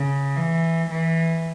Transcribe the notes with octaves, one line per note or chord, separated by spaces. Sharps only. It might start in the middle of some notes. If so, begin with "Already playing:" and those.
Already playing: C#3
E3
E3